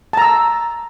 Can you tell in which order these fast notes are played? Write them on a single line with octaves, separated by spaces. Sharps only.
A5 A#5 E6